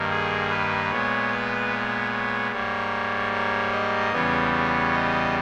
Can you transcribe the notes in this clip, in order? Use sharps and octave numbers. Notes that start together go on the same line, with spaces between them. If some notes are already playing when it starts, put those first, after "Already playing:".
Already playing: G2 D#3 A#3
G#4
B4
A#2 G#3 B3 C#5
B4
C#5
C#5
G#2 G3 A#3 C#5
C#5
D#5
E2 C#3 G3 B3 C#5
C#5
D#5